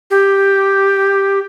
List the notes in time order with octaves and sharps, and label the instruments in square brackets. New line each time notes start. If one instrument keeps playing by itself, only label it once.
[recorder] G4